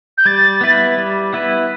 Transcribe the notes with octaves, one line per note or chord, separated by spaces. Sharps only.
G6
G3 A6
B3 E4 B4
G3
B3 E4 B4